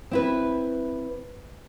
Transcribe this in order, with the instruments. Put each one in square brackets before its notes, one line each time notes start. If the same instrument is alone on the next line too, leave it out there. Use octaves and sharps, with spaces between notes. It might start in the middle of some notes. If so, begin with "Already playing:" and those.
[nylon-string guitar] C4 E4 B4